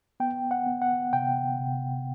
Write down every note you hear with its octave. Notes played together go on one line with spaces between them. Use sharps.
B3 G5
F#5
B3
F#5
C3 G5
C3